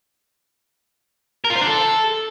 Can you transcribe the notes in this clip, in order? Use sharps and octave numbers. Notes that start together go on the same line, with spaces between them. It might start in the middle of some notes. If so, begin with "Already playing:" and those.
A#4
F4
C5
D4
A4